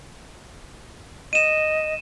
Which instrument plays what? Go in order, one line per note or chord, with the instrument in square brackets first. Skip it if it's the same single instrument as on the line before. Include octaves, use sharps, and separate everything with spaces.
[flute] D#5 [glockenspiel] D#7 E7